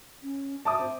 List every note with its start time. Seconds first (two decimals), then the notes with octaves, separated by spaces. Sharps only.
0.23 C#4
0.65 E5 A5 D6 D#6
0.80 C4